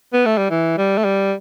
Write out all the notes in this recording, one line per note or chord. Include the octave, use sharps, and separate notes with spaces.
B3
A3
G3
E3
G3
A3
G3